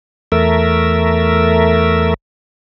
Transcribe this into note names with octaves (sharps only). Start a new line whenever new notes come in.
E2 A3 A#4 E5